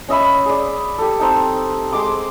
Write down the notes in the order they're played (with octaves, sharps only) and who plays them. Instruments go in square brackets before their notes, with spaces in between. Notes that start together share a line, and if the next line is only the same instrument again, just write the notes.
[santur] C#4 D#5 E5 B5
G#4 D5
G4 A4
C4 D#4 A5
G#3 G5 D6